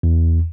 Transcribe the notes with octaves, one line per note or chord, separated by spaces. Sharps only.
E2